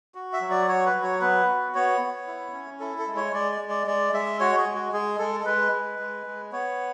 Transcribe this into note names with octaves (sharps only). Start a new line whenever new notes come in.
F#4
E5
F#3
D5
F#4 C#5
B4
F#3
C#5
B3 B4
F#4
B3 C#5
B3
E4
C#4
E4 A4
A4
G#3
C#5
G#3 D5
D5
G#3
D5
G#3 D5
G#3 E5
F#4 C#5
G#4
G#3
F#4
G#3 G#4
G#3 A4
A4
G#3 B4
G#3
G#3
G#3
B3 C#5